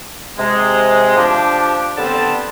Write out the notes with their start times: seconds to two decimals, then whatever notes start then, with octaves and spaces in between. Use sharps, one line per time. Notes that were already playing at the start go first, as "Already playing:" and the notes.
0.38 C3 G#3
1.17 F3 D4 G4
1.98 D3 G3 B3 C4 A5